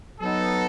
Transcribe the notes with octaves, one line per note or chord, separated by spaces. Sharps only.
F#3 B3 D#4 A4